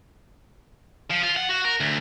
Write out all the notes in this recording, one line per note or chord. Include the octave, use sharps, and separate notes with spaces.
F3
F4
F#5
F#4
A#4
D2